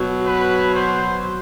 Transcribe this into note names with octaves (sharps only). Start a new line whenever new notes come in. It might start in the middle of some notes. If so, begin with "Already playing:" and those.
Already playing: B2 F#3
B4
C5